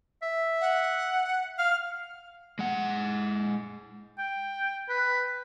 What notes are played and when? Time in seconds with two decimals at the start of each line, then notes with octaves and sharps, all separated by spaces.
0.22 E5
0.61 F#5
1.58 F5 F6
2.59 G#3 F#5
4.18 G5
4.89 B4